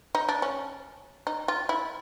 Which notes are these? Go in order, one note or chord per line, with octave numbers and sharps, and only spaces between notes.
D#4
D4
C#4
D#4
F4
E4